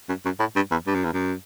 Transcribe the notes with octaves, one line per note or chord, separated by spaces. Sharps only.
F#2
F#2
A2
G2
E2
G2
F#2
E2
F#2